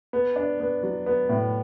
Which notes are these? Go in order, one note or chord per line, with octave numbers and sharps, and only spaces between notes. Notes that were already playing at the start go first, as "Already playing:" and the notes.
B3
D4
B3
F#3
B3
A2